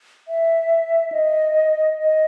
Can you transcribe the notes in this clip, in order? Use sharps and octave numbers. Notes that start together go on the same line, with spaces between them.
E5
D#5
D#5